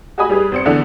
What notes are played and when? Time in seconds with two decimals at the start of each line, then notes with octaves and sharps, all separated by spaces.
0.18 F#4 G4 D#5 G#5 B5 D#6
0.30 G3 G4 G#4 B4
0.52 G#1 C4 C#7
0.65 E2 D3 E3 D4